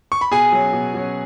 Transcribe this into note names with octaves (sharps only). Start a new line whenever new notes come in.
C#6
B5
B2 G#4 G#5
F#3 C#4
B2
F#3 C#4